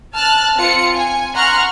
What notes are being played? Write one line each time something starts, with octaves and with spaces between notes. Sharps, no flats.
A5 F6 F#6 A6
C4 F4 C#7
G#5
F#5 A#5 C6 C#6 F6 F#6